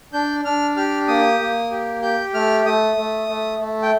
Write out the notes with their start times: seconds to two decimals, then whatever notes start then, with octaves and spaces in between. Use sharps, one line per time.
0.13 D4 G6
0.45 D4 F6
0.77 G4 F6
1.08 A#3 D#6
1.40 A#3
1.71 G4
2.02 G4 G6
2.34 A3 F6
2.66 A3 D#6
2.97 A3
3.29 A3
3.60 A3
3.82 G5